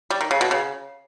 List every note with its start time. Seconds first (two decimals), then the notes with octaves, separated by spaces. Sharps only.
0.10 G3
0.21 D#3
0.31 C#3
0.41 B2
0.51 C#3